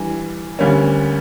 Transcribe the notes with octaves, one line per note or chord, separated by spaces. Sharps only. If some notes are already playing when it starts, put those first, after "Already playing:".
Already playing: E3 G3 D4
D2 D3 G3 A#3 C#4